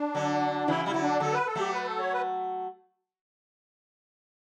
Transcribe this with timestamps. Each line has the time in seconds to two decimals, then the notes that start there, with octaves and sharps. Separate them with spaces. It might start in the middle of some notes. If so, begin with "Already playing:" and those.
Already playing: D4
0.15 D3 F#3
0.68 C#3 E3 E4
0.85 G3 E4
0.94 D3 F#3
1.03 D4
1.20 D3 F#3 A4
1.34 B4
1.47 A4
1.56 F#3 A3 G4
1.73 B4
1.87 A4
1.99 C#5
2.13 B4